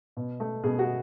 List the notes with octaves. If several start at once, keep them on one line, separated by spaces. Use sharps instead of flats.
B2
A3
B2 G#4
F#4